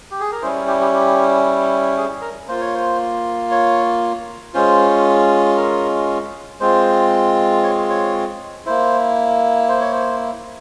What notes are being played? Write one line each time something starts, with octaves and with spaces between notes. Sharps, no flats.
G4
G#4
A#4
G3 C#4 E4 C5
G4
G4
G4
G#4
A#4
A#3 F4 C5
C#5
C5
C#5
G#3 C#4 F4 C5
A#4
G#3 C4 F4 C5
C#5
C#5
A#3 E4 C5
C5
C#5
C5